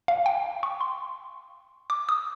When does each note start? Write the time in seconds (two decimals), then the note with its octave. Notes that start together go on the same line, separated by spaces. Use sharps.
0.08 F5
0.26 G5
0.63 C#6
0.81 C6
1.90 D6
2.09 D#6